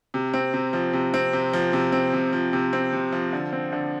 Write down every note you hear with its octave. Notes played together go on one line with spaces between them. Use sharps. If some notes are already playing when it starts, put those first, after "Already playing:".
C3
C4
C3
F3
C3
C4
C3
F3
C3
C4
C3
F3
C3
C4
C3
F3
D3
C4
D3